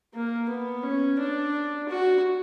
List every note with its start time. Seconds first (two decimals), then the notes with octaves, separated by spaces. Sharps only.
0.14 A#3
0.49 B3
0.83 C#4
1.19 D4
1.88 F#4